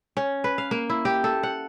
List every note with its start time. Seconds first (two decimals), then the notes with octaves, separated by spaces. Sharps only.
0.17 C#4
0.44 B4
0.58 F5
0.71 A#3
0.89 E4
1.05 G4
1.24 A4
1.43 F#5